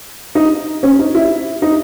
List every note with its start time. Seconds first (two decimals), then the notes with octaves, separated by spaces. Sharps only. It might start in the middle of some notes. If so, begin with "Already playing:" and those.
0.35 D#4
0.83 C#4
0.99 D#4
1.15 E4
1.62 D#4